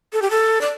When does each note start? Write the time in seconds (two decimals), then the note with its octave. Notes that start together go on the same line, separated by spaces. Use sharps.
0.13 A4
0.22 G4
0.31 A4
0.61 D5